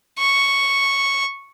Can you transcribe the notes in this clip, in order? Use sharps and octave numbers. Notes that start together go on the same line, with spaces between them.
C#6